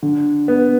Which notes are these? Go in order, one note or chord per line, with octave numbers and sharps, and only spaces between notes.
D3
B3